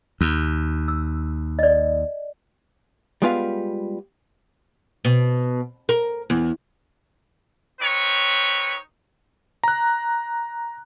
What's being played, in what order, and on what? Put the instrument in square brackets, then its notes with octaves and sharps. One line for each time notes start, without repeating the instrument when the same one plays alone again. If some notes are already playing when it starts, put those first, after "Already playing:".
[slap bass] D#2
[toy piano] E6
D5 D#5
[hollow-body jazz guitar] G3 G#3 B3 F4 B4 F5
[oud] B2
A#4
E2
[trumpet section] C4 D#4 B4 C#5
[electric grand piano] A#5 F#6